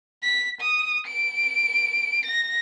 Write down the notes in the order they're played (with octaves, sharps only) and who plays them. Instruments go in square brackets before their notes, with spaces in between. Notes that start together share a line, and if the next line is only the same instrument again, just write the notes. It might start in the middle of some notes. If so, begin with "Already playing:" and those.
[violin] B6
D#6
D7
A#6